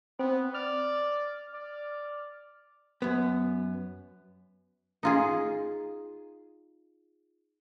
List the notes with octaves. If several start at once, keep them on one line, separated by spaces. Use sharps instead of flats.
B3 C4
D5 F6
D5
F#2 B3
D#4 F4 G#4